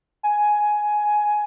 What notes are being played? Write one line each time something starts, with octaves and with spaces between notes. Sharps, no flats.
G#5